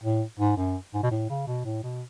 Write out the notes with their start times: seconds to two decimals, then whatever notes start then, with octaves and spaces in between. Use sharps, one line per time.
0.03 A2
0.39 G#2
0.57 F#2
0.94 G#2
1.03 B2
1.11 A2
1.29 C#3
1.47 B2
1.65 A2
1.83 B2